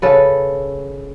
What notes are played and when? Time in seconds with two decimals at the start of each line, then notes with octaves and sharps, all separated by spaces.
0.02 C#3 A4 B4